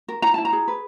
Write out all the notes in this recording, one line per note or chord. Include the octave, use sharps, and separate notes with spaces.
A#4
E4 A#5
E4 A5
A#5
G#4
B4